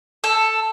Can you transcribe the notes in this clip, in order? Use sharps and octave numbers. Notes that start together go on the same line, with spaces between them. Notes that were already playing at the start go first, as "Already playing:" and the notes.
A4